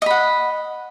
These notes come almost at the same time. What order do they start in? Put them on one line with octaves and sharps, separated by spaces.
D#5 B5 F#5